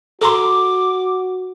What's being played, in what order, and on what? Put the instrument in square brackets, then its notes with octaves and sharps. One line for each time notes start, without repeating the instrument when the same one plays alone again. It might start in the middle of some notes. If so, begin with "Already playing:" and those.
[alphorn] F#4 [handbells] A4 A#5 C6 [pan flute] D6